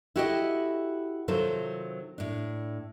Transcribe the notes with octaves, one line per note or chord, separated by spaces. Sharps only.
E4 F#4 G4 A4 B4 D#5
C3 D#3 F#3 F4 A4 C5
A2 D4